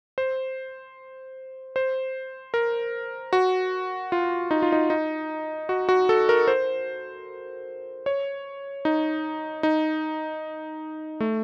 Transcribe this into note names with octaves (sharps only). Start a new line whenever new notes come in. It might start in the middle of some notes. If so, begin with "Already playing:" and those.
C5
C5
A#4
F#4
F4
D#4
F4
D#4
D#4
F#4
F#4
A4
A#4
C5
C#5
D#4
D#4
A3